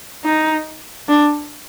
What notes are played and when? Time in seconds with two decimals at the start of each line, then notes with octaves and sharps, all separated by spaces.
0.24 D#4
1.09 D4